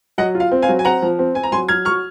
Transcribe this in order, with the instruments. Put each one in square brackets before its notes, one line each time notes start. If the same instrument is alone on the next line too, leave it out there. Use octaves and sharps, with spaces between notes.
[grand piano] F#3 [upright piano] D#5 F#5
[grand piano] F4
[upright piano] F5
[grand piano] C4
[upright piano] F5 G#5
[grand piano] F#3
[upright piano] G#5
[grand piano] C4 [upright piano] F#5 A#5
[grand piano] F3
C4
[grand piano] C4 [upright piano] G#5
[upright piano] A#5
[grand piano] F#3 [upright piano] G#5 C6
[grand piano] F#3 [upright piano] F6 G#6
[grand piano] F#3 [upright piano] C#6 F6